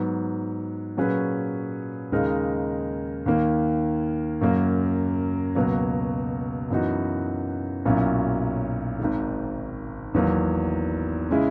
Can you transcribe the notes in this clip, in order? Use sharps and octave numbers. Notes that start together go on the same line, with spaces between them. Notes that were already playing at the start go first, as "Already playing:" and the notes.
Already playing: G#2 F#3 B3
A#2 F#3 C#4 G#4 B4
D#2 C#3 G#3 D#4 A#4
D#2 D#3 A#3
F#2 C#3 F#3 A#3
C#2 B2 F#3 A#3
F#2 E3 B3 D#4 F#4
B1 A#2 F#3 C#4 E4
G#1 G#2 D#3
E2 D#3 F#3 A#3
C#3 G#3 C#4 E4